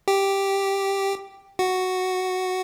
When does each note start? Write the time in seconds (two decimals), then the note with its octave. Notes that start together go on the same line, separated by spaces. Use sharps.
0.08 G4
1.59 F#4